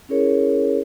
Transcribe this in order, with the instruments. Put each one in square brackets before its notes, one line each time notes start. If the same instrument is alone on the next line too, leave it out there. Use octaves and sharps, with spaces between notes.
[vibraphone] C#4 E4 G#4 A#4 C#5